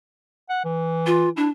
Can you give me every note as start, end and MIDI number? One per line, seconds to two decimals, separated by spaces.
0.50 0.62 78
0.64 1.29 52
1.06 1.29 65
1.37 1.49 62
1.37 1.48 64